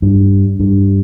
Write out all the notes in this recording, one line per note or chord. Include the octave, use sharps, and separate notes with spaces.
G2
G2